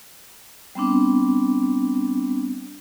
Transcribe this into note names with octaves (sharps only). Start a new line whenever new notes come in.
G3 B3 C4 D4